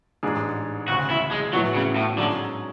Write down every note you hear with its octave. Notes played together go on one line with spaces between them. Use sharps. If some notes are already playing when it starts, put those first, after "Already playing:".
A1 G#2 G#3 D4 G#4
E1 D2 C#3 F#4
E4
G#3
A2 E3 F#3 B3 F#4
C#3
A2
G#2 D3 F#3 C#4 G#4